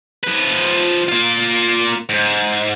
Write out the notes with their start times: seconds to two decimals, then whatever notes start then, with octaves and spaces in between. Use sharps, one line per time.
0.23 F3 B4
1.08 A#3 F4
2.09 G#2